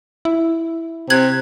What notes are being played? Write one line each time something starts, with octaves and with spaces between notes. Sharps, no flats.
E4
C3 F#6 G#6 F#7